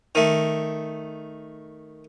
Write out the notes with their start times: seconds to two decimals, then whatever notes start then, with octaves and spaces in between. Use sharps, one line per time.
0.15 D#3 A3